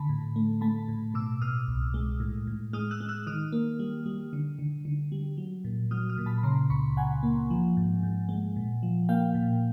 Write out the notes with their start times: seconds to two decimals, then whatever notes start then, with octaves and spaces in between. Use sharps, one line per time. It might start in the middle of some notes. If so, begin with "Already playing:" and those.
Already playing: D3 A5 B5
0.09 A2
0.36 A3
0.61 A3 A5 B5
0.88 A2
1.14 B2 D6 E6
1.41 B2 D#6 F6
1.68 C2
1.94 G#3
2.20 A2
2.47 A2
2.73 G#3 D#6 F6
2.91 E6 F#6
3.00 G#3
3.09 E6 F#6
3.27 D#3 D#6 F6
3.52 A#3
3.79 G3
4.06 G3
4.33 D3
4.59 D3
4.85 D3
5.12 G3
5.38 F#3
5.65 A#2
5.91 F#3 D#6 F6
6.09 D#6 F6
6.18 A#2
6.26 A5 B5
6.38 B5
6.43 C#3 A#5 C6
6.70 C#2 B5 C#6
6.97 C#2 F#5 G#5
7.23 A#3
7.50 F3
7.77 G#2
8.03 G#2
8.29 G#3
8.56 A#2
8.83 F3
9.09 A#3 F5 G5
9.35 A#2